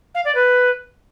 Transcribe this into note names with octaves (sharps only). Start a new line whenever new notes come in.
F5
D5
B4